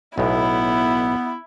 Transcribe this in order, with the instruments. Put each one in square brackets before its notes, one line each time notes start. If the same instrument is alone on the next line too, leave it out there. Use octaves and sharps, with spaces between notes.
[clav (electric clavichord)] B1 A2 [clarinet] B3 [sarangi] E4